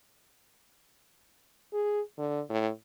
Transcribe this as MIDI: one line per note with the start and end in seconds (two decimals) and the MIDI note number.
1.73 2.01 68
2.18 2.41 50
2.50 2.69 45